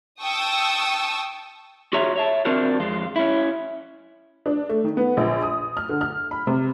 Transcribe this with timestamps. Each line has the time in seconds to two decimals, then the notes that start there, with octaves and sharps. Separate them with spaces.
0.22 G5 A5 C#6 D#6 E6
1.93 F4 F#4 G#4 C#5 E5 A#5
2.16 C#5 E5 A5
2.45 C4 D4 F4 F#4 A#4 C5
2.80 F2 G#3 F4
3.16 C#4 E4
4.46 D4
4.69 A3
4.84 D#3
4.97 B3
5.17 A#1
5.42 D#6
5.77 F6
5.89 D3
6.01 F6
6.31 B5
6.47 C3